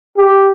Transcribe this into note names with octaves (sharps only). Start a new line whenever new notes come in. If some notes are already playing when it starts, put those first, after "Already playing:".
G4